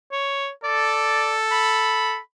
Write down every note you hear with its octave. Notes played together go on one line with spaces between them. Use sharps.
C#5
A4 D5
B5